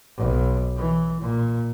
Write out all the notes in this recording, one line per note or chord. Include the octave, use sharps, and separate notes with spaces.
B1
E3
A#2